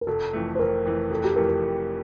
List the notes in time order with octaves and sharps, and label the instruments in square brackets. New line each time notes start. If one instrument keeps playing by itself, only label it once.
[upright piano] A#4
[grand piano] F1 [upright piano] A4
[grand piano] F2 E3 A3
[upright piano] C5
[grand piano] F1 [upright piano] A#4
[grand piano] F2 E3 A3
[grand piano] F1 [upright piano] A4
[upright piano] G4
[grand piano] F2 E3 A3 [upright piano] A#4
[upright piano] A#4
[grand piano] F1